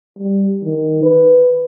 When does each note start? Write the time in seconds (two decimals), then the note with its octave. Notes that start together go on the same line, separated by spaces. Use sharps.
0.19 G3
0.64 D#3
1.03 B4